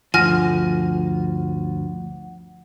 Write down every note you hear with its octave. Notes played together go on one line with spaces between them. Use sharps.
G1 D2 F3 F#5 G#5 F6 A#6